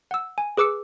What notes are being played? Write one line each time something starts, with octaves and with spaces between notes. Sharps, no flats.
F#5 E6
G#5
G#4 B4 D6 E6 C#7